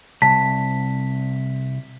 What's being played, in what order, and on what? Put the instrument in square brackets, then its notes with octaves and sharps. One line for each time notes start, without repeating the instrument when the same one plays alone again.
[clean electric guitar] C2 [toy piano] A5 [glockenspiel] B6